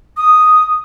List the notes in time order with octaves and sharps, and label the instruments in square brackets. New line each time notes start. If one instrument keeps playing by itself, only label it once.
[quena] D#6